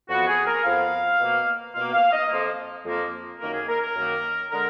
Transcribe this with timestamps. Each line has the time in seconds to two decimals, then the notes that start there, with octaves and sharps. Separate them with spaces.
0.09 F2 F3 B3 F#4
0.28 G#4
0.46 A#4
0.64 F2 F3 B3 F5
1.21 B2 A#3
1.75 B2 A#3 F5
1.93 F5
2.13 D#5
2.30 F2 F3 A#3
2.86 F2 F3 A#3
3.40 F#2 D#3 A#3 A#4
3.55 G#4
3.68 A#4
3.82 A#4
3.96 F#2 D#3 A#3
4.51 D3 G#3 A#4